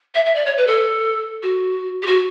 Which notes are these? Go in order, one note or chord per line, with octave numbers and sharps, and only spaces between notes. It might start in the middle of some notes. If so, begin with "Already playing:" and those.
E5
E5
D5
C#5
B4
A4
F#4
G4
F#4